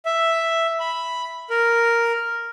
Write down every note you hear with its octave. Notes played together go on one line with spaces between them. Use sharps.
E5
B5
A#4